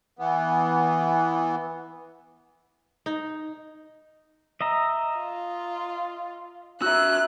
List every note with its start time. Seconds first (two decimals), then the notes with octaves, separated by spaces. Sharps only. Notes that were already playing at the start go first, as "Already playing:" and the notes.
0.19 E3 B3
3.06 D#4
4.61 D#5 E5 A#5
5.18 F4
6.82 F#4 E5 E6 F#6